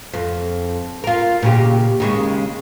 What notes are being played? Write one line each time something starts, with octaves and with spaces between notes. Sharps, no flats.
F2
F4 A#4
A#2 C#3 G4
D#2 C#3 G#3